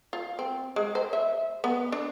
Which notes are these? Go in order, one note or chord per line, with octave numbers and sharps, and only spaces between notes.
F4
C4
G#3
C5
E5
B3
D4